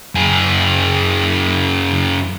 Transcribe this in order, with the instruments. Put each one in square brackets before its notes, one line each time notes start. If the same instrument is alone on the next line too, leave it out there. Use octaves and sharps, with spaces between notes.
[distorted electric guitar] F#2 G#4